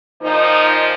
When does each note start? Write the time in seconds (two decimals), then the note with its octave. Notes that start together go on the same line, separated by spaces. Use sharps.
0.21 A#2 F3 D#4